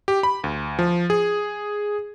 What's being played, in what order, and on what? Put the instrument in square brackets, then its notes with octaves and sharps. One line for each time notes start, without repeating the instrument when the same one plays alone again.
[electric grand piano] G4
B5
D2
F3
G#4